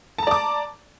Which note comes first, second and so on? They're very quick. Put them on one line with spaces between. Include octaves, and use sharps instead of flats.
A5 A#5 D5 D6